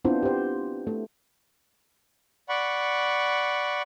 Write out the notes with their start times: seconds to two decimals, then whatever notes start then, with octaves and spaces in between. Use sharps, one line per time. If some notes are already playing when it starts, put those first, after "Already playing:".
0.05 B3 C4 D4 E4 F4 C5
0.23 G4 C5
0.87 A3
2.49 D5 F#5 B5 C#6